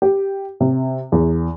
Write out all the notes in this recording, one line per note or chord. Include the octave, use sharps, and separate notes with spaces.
G4
C3
E2